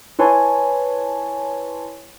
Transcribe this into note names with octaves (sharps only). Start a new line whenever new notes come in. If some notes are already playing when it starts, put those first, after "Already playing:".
E4 B4 C#5 G#5 A5 C6